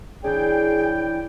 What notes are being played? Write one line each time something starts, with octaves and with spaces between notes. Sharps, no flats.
E3 D4 G#4 C#5 D5 G5